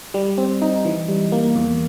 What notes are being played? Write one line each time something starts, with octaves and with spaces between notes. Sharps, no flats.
G3
C4
D#4
E3
G3
A#3
E2